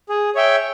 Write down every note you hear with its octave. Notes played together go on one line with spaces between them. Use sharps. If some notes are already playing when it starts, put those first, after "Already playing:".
G#4
C#5 E5 G5